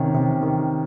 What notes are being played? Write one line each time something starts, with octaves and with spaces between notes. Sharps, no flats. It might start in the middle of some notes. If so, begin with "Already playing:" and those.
Already playing: C3 D#3 C#4
C3
D#3